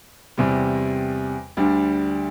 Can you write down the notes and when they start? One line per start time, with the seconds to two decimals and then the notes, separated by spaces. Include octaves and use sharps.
0.38 E2 C3 G3
1.57 D2 D3 G3 D4